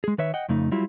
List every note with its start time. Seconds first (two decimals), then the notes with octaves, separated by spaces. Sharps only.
0.04 G#3 G#4
0.18 D#3 B4 C#5 E5
0.34 D#5 F#5 G5
0.49 F2 C#3 A3 D#4
0.72 F#3 G3 E4 F4 G4